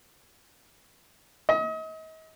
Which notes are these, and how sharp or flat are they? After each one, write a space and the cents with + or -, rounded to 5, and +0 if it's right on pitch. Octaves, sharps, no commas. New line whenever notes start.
D#5 +35